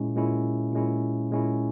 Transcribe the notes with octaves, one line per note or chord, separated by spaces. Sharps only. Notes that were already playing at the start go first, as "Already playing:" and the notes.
Already playing: A#2 G#3 C#4 E4
A#2 G#3 C#4 E4
A#2 G#3 C#4 E4
A#2 G#3 C#4 E4